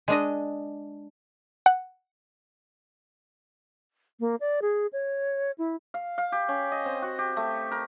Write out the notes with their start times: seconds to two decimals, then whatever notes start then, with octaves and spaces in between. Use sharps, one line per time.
0.08 G#3 D4 D#5
1.66 F#5
4.20 A#3
4.40 D5
4.62 G#4
4.93 C#5
5.58 E4
5.94 F5
6.18 F5
6.32 G4
6.48 C#4
6.72 D#5
6.85 C4
7.02 F#4
7.19 G4
7.37 A3
7.71 A#4